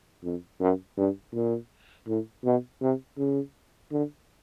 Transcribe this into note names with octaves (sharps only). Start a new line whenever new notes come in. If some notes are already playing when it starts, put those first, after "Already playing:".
F2
F#2
G2
A#2
A2
B2
C3
C#3
D3